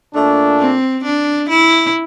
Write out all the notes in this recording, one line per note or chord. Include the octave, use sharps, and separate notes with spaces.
A#2 A3 D4
C4
D4
E4